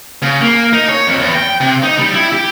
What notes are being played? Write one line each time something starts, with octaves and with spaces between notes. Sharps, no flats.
C#3
A#3
D#4
C#5
F2
E2
G5
C3
D#4
G3
E4
G4